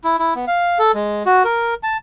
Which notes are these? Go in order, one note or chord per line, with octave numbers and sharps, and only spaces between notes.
E4
E4
B3
F5
A4
G#3
F#4
A#4
A5